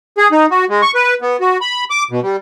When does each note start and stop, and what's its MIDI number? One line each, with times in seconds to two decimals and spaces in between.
0.18 0.28 68
0.32 0.46 63
0.51 0.65 66
0.69 0.81 56
0.82 0.91 85
0.95 1.14 71
1.21 1.37 59
1.40 1.57 66
1.61 1.84 83
1.90 2.04 86
2.11 2.20 47
2.23 2.36 55